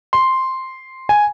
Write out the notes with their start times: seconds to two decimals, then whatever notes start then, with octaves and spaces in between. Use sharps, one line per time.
0.13 C6
1.09 G#5